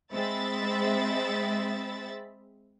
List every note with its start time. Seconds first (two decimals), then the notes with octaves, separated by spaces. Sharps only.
0.13 G#3 C4 E5 B5 A6